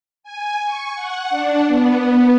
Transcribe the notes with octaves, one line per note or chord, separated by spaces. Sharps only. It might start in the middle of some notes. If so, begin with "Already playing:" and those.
G#5
C#6
F#5
D4
B3